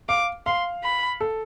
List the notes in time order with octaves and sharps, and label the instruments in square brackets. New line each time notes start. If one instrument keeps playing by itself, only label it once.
[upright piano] F5 [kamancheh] D6
[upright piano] F5 [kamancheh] C6
[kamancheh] B5
[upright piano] A4